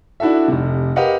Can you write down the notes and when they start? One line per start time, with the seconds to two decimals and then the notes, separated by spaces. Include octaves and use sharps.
0.20 D4 E4 F#4 A4 E5
0.48 F1 C3
0.96 G4 A#4 B4 D#5 F5 F#5